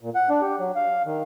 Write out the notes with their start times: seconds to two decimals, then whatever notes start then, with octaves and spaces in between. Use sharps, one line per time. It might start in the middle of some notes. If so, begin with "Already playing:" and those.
0.01 A#2
0.15 F#5
0.30 D4
0.41 G4
0.59 F#3
0.75 F5
1.06 D#3